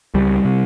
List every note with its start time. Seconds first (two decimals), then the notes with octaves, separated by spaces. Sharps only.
0.14 C#2 G3
0.45 C3